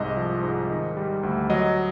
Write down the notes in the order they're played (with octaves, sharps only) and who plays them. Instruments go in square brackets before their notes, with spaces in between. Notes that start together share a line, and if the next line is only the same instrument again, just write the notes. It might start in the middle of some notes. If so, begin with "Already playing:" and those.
Already playing: [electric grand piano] C2 G#2 D#5
F3
G#2
D#3
G3
D2
F#3 D#5